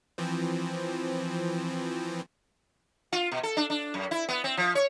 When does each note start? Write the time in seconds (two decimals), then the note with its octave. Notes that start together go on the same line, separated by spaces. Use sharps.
0.18 E3 F3 C4
3.12 F4
3.32 B2
3.43 A4
3.57 D4
3.70 D4
3.94 F#2
4.11 E4
4.29 B3
4.44 C4
4.57 F3
4.75 C#5